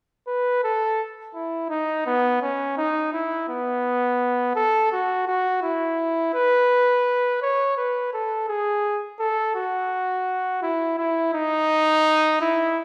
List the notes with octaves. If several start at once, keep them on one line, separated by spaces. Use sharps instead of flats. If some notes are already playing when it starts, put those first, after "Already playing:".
B4
A4
E4
D#4
B3
C#4
D#4
E4
B3
A4
F#4
F#4
E4
B4
C#5
B4
A4
G#4
A4
F#4
E4
E4
D#4
E4